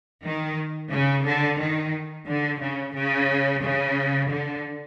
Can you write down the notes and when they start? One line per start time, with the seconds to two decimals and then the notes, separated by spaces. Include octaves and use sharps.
0.24 D#3
0.92 C#3
1.26 D3
1.59 D#3
2.27 D3
2.61 C#3
2.95 C#3
3.63 C#3
4.30 D3